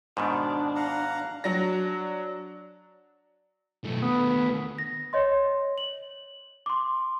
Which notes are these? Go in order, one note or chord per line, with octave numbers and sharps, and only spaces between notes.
G#2 B2 D#3 D4
F5 F#5 A#5
F#3 D4 A#6
B1 A3
D#2 A3 B3
A#6
C#5 D#5 C6
F#7
C6 D6